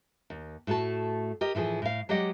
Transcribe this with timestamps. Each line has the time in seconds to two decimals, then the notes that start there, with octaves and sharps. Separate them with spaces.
0.30 D#2
0.67 A2 A3 F#4 A4 A5
1.41 G4 A#4 D#5
1.55 A2 E3 F3 G#4
1.82 A2 F5
2.09 F#3 G#3 G4 D5 D#5 F#5